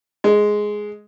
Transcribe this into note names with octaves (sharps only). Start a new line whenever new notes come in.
G#3